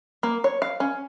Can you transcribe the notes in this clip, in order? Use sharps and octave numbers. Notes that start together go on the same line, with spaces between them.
A#3
C#5
F5
C#4